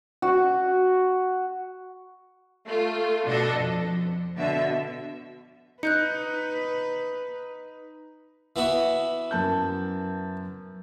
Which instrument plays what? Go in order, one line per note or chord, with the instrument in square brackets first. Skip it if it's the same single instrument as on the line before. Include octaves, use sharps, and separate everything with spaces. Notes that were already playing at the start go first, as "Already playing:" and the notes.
[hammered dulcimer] F#4
[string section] A3 F4
B2 D4 A4 D#5
F2
B2 D3 E5
[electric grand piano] D#4 [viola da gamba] B4 [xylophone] F#6 G6 C#7
[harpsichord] E3 B3 F#4
[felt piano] F#2 A5 G6